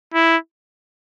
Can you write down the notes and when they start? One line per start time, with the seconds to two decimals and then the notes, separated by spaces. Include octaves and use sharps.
0.15 E4